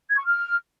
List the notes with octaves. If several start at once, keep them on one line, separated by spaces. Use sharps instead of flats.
G#6
C#6
F6